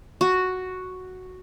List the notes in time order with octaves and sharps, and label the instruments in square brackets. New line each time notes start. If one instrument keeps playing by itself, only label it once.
[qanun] F#4